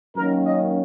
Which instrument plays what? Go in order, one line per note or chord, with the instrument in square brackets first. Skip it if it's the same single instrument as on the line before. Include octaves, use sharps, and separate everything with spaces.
[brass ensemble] F#2 D#3 A#3 C#4 A#4
D#5